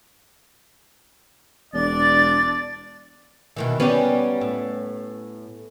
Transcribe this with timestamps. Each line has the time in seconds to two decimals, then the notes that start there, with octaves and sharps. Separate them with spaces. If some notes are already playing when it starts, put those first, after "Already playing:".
1.74 E1 D4 D5 A6
3.56 B2 D#3 E3
3.80 F#3 G3 B3 C#4 G4
4.41 A2